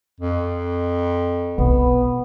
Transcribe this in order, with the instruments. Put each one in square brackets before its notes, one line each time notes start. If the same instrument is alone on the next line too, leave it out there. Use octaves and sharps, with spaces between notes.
[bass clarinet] F2
[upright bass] B1 [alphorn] B3